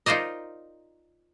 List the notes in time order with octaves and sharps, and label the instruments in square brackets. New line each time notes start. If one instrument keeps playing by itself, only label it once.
[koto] D#4 F4 A#4 C5 D5 D#5